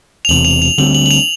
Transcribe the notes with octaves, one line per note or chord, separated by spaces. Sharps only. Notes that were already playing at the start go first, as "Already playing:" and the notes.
F7
E1 E2 C3 F#7
F7
F7
D2 D3 G3 C4 F#7
F#7
F#7
F7